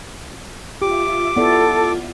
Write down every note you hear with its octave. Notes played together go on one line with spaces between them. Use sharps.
F4 G4 E5 D6
B3 E4 A4 D5